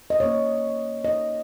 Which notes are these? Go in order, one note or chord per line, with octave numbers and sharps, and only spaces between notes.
D#5
B2 A#3 C#4 C#5
D#5